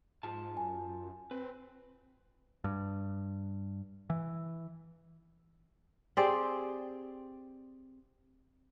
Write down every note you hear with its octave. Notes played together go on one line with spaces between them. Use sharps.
G#2 F4 A5
F#2 G#5
C4 B4
G2
E3
C4 G4 G#4 D5